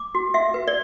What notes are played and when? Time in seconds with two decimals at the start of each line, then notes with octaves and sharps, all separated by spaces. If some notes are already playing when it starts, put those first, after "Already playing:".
Already playing: D6
0.15 F#4
0.34 F#4 E5
0.54 B4
0.68 D5